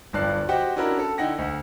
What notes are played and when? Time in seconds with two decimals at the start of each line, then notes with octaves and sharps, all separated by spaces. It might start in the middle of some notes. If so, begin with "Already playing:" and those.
0.13 D1 G1 G2 D5 F#6 C7
0.49 F#4 G4 C5 D#5 F#5 G5
0.76 C#4 D4 E4 F#4 A#4 B5
0.99 A4
1.18 D3 D#4 E4 F#5 G5 A#6
1.38 D2 F#5